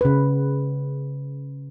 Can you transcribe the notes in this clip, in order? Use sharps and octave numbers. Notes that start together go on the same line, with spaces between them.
C#3 B4